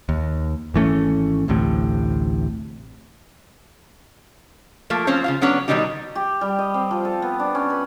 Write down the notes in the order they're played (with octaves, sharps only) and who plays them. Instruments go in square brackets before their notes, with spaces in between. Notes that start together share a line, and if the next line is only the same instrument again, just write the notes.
[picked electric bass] D#2
G#1 E3 A3 C#4
A1 D2 A2 C3
[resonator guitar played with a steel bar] F3 A3 A#3
F3 C4 C#4 C5 C#5
C#3 F4 F5
F#3 B3 C#4 D4 C#5
B2 D#3 F#3 G3 D#4 G4
[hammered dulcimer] G4
G3
D#5
C4
F3
A4
B3
D4
C#4
B4